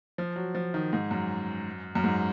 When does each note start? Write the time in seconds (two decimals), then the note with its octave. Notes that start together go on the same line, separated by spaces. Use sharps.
0.18 F3
0.36 F#3
0.55 F3
0.74 D#3
0.93 G#2
1.11 F#2
1.95 F#2
2.04 G#2